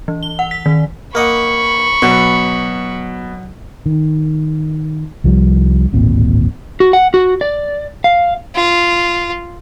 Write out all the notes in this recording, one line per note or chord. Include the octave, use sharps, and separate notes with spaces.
E3
G7
F#5
B6
D#3
A#3 D#5 F#5 B5 C#6
B2 F#3 C6
D#3
C2 F3 G3
D1 G#1 A#2 C4
F#4
F#5
F#4
D5
F5
F4